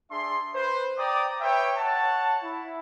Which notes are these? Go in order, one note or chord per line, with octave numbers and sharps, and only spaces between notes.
D4 G#4 E5 C6
B4 C5
D5 G5 A#5 D6 D#6
B4 C#5 E5 G5
C#5 F#5 A5
E4